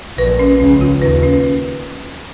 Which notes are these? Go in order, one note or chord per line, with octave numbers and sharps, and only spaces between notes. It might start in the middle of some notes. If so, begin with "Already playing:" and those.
A#1 A#2 B4
C#4
C#2 C#3 C#4
F4
D#2 D#3 B4
C#4